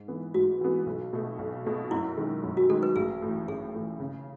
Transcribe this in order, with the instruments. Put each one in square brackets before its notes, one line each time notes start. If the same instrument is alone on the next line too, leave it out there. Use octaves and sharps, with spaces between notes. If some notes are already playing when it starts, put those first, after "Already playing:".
Already playing: [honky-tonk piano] G#2
E3 B3
[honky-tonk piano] G#2 [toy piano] F#4
[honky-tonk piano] E3 B3
B1
B2 A3
B1
B2 A3
[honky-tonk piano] F#2 [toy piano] E4
[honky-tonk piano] D#3 G#3
F#2
[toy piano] F#4
[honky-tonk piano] D#3 G#3 [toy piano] A4
[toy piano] B4
[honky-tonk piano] A1 [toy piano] G#4
[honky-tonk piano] A2 E3
[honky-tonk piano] A1 [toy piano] G#4
[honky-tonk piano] A2 E3
C#3